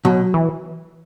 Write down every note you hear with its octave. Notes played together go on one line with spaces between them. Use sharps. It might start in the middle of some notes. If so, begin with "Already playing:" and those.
B2 F#3
E3